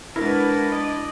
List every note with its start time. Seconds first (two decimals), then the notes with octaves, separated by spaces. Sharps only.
0.16 G#3 D4 E4 F#4 A#4 B4 A6
0.72 D5 D#5